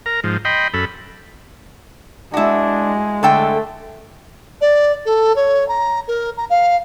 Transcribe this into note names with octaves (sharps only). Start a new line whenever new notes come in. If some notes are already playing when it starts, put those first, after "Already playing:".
A#4 A#5
G#2 F3
D#5 G5 B5 C6
F#2 A4 B5
G#3 D4 E4 F#4
D3 A3 A4 G5
D5
A4
C#5
A#5
A#4
A#5
F5